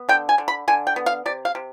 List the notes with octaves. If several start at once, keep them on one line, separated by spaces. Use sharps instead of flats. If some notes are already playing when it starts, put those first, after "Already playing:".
Already playing: B3
D3 G5
G#5
D3
B5
D3 G#5
G5
B3
F5
C3 D5
F5
C3